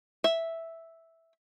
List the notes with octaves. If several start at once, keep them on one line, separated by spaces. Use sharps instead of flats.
E5